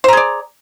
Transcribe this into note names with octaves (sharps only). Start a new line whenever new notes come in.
G#4 C5 D5 A#5